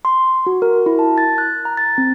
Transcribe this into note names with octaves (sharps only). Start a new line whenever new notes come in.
C6
F#4
A#4
E4
A5
A6
F#6
A#5
A6
C4